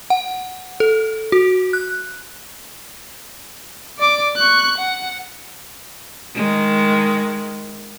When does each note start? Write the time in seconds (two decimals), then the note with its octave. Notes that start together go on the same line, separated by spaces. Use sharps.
0.10 F#5
0.80 A4
1.32 F#4
1.73 F#6
3.99 D5 D6
4.37 C#6 F#6
4.78 F#5
6.35 D#3 G#3